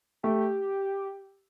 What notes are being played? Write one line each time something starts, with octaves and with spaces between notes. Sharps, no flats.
A3 G4